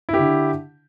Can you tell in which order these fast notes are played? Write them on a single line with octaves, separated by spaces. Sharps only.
E4 G4 D3